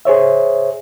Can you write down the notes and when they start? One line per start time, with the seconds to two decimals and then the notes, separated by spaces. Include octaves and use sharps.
0.05 G#4 C5 C#5 E5